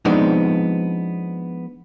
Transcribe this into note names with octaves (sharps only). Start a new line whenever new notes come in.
F3 G#3 B3 C4 D4 D#4